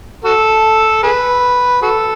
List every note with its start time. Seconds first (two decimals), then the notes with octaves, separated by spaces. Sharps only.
0.24 F#4 A4
1.03 G#4 B4
1.82 F#4 A4